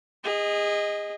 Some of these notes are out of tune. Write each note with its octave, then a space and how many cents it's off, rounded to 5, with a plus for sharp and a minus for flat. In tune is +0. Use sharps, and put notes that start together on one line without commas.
G#4 -30 D#5 +0